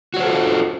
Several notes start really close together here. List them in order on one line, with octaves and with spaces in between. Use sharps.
F#4 C#5 C5 A4 F4